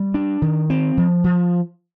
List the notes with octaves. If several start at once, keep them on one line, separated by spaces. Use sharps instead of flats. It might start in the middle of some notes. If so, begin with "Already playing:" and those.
Already playing: G3
D4
D#3
C4
F3
F3